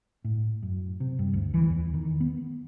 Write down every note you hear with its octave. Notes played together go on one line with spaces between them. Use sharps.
A2
F#2
C3
G2
D2
E3
E2
D#3
B3